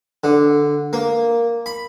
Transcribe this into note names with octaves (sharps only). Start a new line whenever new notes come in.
D3
A#3
B5